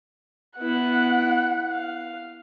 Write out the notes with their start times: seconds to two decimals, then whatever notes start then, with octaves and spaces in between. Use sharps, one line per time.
0.59 B3 E4 F#5
1.70 F5